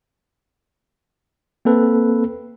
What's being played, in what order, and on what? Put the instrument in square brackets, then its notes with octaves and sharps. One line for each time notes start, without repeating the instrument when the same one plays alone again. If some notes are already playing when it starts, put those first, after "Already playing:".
[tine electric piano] A#3 C4 A4 B4